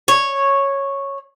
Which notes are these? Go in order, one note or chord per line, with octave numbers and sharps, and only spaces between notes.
C#5